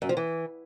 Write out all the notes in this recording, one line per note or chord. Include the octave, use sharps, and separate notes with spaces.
F#2
F3
E3